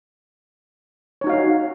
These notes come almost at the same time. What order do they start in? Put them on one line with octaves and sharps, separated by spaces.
C#5 D#4 F#4 F5